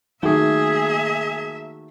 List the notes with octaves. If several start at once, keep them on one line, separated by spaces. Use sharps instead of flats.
D#3 F#3 A3 A#3 G#4 E5